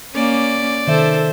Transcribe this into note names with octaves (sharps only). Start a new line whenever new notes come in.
A#3 C#4 D5
C3 D#3 A4 C5 E5